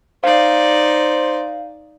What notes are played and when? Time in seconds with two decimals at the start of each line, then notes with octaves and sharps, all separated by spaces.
0.24 D#4 C5 D5 F5